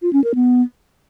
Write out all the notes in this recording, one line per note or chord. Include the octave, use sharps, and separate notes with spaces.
F4
C#4
A#4
B3